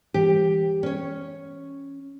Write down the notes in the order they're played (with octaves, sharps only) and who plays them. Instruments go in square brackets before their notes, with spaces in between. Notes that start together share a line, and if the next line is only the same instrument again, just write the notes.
[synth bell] E3 [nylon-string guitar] G4
[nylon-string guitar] C#4 C#5